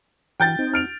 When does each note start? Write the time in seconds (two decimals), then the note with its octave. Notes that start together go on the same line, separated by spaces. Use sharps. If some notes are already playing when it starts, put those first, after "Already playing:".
0.40 E3 G5 G6 A6
0.59 C4 D#4
0.74 F6 D7 F7